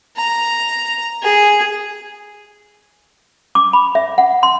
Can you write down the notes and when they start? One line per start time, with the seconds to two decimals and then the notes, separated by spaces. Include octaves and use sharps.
0.17 A#5
1.22 G#4
3.55 D6
3.73 B5
3.95 E5
4.18 F#5
4.43 C6